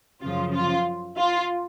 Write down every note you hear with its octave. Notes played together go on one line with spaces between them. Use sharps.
F#2 C#3 F3 F4
F4
F4